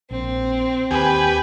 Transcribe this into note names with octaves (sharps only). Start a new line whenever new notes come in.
A#1 C4
D#2 G4 B4 G#5